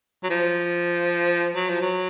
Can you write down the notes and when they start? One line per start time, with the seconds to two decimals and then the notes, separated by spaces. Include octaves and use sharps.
0.23 F#3
0.30 F3
1.56 F#3
1.69 F3
1.82 F#3